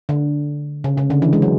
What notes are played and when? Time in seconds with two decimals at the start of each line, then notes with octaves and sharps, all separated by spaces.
0.09 D3
0.84 C#3
0.97 C#3
1.10 D3
1.22 E3
1.33 G#3
1.42 F#3